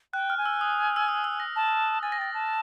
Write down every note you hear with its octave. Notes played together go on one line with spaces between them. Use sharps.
G5 F#6
F6
G#5
E6
D#6
D#6
E6
D#6
E6
A#6
A5
G#5 A6
A#6
G5 A6
A5